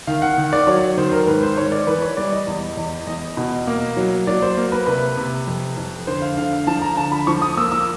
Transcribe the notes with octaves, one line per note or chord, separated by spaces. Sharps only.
D#3 F5
F#5
D#3
D5
F#3 C#5
D#3 C5
A#4
G#2 B4
C5
G#2 C#5
D5
E3 B4
C#5
G3 D5
D#5
E2
E2
E2 D#5
B2
A#3
F#3
F#3 D5
C5
A#3
B4
C3 B4
C3
F2
F2
D3 C5
F5
D3 F5
F5
F3 A5
A#5
D3 A5
B5
F3 C#6
D#6
A#3 E6
E6